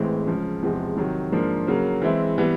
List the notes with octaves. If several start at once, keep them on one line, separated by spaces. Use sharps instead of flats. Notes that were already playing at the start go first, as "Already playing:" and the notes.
Already playing: A1 A2 E3 G#3 C4
C#2 C#3 F3
E2 C3 F3 G#3
C3 D#3 F#3
G#2 F3 A#3 D4
C#3 F#3 A#3
E3 G#3 C4 E4
E3 G3 B3